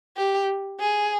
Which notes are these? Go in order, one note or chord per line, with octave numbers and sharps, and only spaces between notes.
G4
G#4